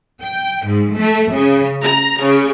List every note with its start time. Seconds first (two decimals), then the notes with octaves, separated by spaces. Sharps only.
0.23 G5
0.66 G#2
0.97 A3
1.31 C#3
1.83 A#5
2.22 C#3